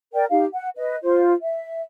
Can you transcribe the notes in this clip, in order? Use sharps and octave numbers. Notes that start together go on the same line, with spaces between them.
A#4 D5 G5
D#4 G4 F5
F#5
B4 D#5
F4 C5
E5